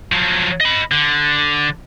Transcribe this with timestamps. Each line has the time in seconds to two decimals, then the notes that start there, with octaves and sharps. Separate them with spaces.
0.12 F3 F#3
0.60 D#5 B5
0.91 D3